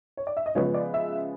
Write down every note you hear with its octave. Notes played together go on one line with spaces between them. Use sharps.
C#5
D5
E5
D#5
C#3 F3 G#3 B3 C#5
D5
E5